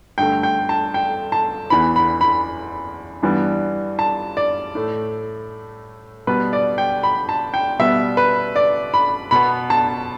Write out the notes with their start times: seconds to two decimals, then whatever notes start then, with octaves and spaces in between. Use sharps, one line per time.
0.18 G2 D3 A3 G5
0.43 G5
0.69 A5
0.94 G5
1.32 A5
1.70 E2 E3 B3 B5
1.96 B5
2.21 B5
3.22 G2 E3 G3 B3
3.99 A5
4.37 D5
4.75 A2 A3
6.27 B2 G3 B3 B4
6.53 D5
6.78 G5
7.03 B5
7.29 A5
7.54 G5
7.79 B2 G3 B3 E5
8.17 B4
8.56 D5
8.94 B5
9.31 B2 B3 B5
9.70 A5